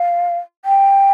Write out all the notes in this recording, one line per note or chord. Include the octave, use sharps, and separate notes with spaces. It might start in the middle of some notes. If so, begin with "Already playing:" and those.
Already playing: F5
G5